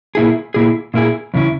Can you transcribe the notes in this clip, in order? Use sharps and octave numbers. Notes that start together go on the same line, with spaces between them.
A#2 A#3 E4 G#4
A#2 A#3 E4 G#4
A#2 A#3 E4 G#4
E2 C#3 F#3 C#4 E4